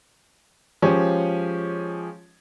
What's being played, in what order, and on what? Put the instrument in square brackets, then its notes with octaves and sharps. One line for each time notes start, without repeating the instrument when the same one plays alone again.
[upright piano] F3 G#3 C#4 G4 G#4 C#5